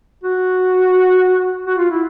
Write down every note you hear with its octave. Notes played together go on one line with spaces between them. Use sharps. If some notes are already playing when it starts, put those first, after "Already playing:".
F#4
F#4
F4
E4